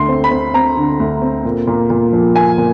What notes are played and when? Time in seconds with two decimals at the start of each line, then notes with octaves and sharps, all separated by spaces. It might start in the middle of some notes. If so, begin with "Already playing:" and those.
Already playing: D2 D3 C6
0.09 C4
0.24 B5
0.31 C4
0.54 C4 A#5
0.77 D3
1.00 D2
1.22 C4
1.45 A#2
1.67 A#2
1.90 A#2
2.13 F3
2.35 A#3 G#5
2.58 A#2